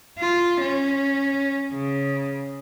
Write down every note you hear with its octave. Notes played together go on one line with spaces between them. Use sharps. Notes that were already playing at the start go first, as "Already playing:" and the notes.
F4
C#4
C#3